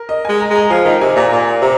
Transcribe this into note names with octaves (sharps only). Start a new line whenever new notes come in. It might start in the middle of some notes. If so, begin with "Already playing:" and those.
Already playing: A#4
D#5
G#3 G#5
A#5
G#3 A#5
F3 G#5
D#3 A#5
C3 G#5
A#2 A#5
A#2 G#5
C3 A#5